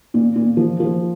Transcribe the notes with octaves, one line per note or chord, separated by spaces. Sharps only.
A#2
A#2
F3
F3